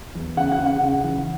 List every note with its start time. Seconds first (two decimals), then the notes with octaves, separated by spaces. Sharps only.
0.15 E2
0.37 C#3 F#5
0.52 F#5
0.59 C#3
0.66 F#5
0.81 C#3
1.04 E3